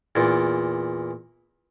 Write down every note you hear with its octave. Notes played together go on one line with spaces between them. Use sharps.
E2 A#2